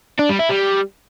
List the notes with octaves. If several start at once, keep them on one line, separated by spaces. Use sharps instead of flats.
D4
G3
E4
G3